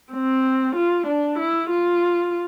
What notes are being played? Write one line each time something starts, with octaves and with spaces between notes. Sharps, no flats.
C4
F4
D4
E4
F4